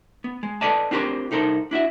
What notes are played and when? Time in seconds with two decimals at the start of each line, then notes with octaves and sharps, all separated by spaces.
0.24 B3
0.43 G#3
0.61 A4 B4 D5 D#5 A5
0.91 C4 D4 F4 G4 A#4 C5
1.31 C2 D#4 A4 A#4 C5
1.71 D4 E4 F#4 E5